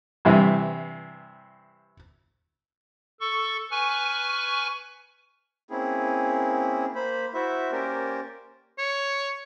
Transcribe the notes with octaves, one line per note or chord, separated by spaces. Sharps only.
G2 C3 E3
A4 C#6
B4 G#5 C#6 F6
A#3 C4 C#4 E4 G#4
A#3 C5 B5
E4 F#4 C5 E5
A#3 C#4 G4 A#4 C5 D5
C#5